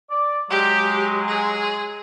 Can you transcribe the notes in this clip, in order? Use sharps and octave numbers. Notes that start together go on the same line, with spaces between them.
D5
F#3 G#3 G4
G#4